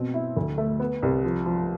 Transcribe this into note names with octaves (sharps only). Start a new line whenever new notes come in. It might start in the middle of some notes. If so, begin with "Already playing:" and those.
Already playing: B2 C4
E4
D2
A3
B3
C2
F3
F3